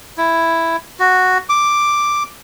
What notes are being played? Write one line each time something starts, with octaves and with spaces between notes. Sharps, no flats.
E4
F#4
D6